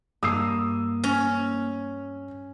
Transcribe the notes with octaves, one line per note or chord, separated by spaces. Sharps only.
G2 A#3 D#6 E6 C7
C#4 A#6